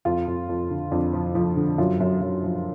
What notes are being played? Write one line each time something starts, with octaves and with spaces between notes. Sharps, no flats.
F2 F4
F2
F2
D3
F2 D4
F3
F3
D3
F#2 F4
F#2
F#2
F3